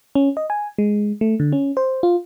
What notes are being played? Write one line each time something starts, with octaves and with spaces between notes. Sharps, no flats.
C#4
D#5
G#5
G#3
A3
D3
C#4
C5
F4